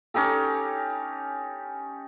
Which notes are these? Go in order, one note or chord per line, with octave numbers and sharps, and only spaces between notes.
C#4 D#4 G4 A4